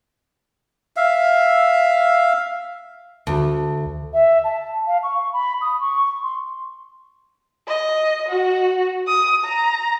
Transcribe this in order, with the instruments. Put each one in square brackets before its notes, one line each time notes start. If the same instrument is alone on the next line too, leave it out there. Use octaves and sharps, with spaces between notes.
[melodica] E5 F5
[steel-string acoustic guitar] D2
[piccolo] E5
A5
F5
C#6
B5
D#6
C#6
C6
[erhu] D#5
F#4
D#6
A#5